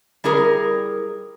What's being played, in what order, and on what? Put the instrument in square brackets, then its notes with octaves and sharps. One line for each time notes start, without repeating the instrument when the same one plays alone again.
[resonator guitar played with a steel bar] G3 E4 G#4 A#4